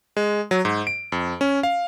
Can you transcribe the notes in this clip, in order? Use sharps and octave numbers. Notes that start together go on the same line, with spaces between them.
G#3
F#3
G#2
D7
F2
C#4
F5